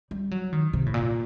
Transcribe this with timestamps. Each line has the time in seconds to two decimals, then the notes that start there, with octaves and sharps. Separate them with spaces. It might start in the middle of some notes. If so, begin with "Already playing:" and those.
0.11 G3
0.31 F#3
0.53 D#3
0.73 C3
0.86 A2
0.94 A#2